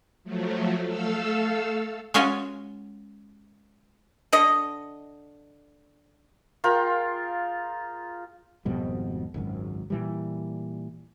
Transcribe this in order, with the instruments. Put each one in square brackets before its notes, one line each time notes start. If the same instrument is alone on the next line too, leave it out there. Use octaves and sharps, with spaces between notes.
[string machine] F3 F#3 A3
A3 A4 F5 E6
[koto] G#3 C#4 F4 F#4 C#5 G#5
[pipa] D3 D#5
[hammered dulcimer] F4 G#4 A#4 G5
[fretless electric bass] G#1 F2 B2 G3
G#1 C#2 F#2
A#2 E3 G3